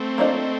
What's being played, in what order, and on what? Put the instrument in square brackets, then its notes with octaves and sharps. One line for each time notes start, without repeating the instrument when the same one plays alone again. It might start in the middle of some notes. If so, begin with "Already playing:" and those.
Already playing: [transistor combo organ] A3 C4
[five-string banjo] A#3 D4 F4 C5 D#5